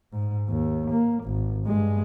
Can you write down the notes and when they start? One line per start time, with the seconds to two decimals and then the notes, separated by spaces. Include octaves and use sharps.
0.12 G#2
0.49 D#2
0.91 A#3
1.25 G#1
1.67 G2 G#3